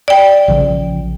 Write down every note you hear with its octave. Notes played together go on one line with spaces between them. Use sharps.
D5 G5
A#1 C#3 F3